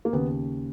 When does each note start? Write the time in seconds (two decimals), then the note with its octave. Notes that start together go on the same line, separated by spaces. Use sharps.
0.05 A#3
0.13 D#2 C#3 B3